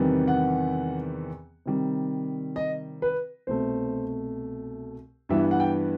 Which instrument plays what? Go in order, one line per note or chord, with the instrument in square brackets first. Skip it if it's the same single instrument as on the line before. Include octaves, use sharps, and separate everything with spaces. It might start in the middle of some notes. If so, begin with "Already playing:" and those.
Already playing: [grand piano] E2 C3 D#3 G3 B3
F#5
C3 D#3 G3
D#5
B4
C2 B2 A3 C5
G2 E3 G3 B3 E4 E5
F#5
G5